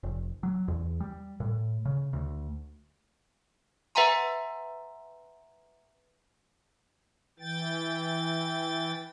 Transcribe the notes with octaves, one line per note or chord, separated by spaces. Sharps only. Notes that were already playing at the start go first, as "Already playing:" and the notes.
F1
F#3
E2
G3
A2
C#3
D2
B4 E5 F#5 G#5 A#5 C6
E3 G5 A6